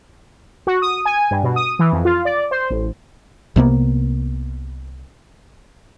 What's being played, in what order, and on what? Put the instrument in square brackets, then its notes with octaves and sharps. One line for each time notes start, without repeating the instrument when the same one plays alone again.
[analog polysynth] F#4
D#6
G#5
G2
B2
D#6
E3
F2
F4
D5
C5
A1
[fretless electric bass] C2 C3 A#3 B3